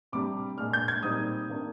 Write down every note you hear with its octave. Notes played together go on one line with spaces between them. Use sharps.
C3 G3 D4 D6
A#2 G#3 D4 F6
G6
G#6
A#2 G3 C4 D#4 D#6
C3 D#3 A#3 D4